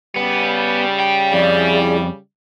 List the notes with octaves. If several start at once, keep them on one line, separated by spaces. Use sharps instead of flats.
C#3 G3 B3
G5
F2 E4 G#4 D5